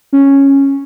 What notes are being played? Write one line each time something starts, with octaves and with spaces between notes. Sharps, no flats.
C#4